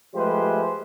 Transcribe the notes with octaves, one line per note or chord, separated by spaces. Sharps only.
F3 G#3 A3 G4 B4 C5